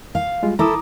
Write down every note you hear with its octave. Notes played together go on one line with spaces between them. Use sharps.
F5
G3 G#3 F4
E4 A4 A#5 D6 D#6